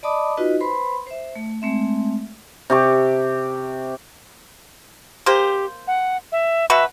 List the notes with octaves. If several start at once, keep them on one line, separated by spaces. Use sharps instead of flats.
D5 D#5 A5 B5 D6 D#6
D#4 F4 F#4 B4 D#5
B4 C5 B5 C6
C5 E5
A3
G#3 A3 C4 E5
C3 G4 C#6
A#3 G4 C5
F#5
E5
B2 F#4 B4 E5